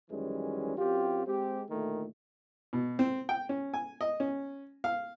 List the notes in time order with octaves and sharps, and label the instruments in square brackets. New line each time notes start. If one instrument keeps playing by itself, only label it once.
[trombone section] F#2 D#3 E3 G3 G#3 C#4
F#2 C4 F4 G4
G#3 C4 G4
D2 A#2 D#3 A3
[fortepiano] B2
C4
G5
C#4
G#5
D#5
C#4
F5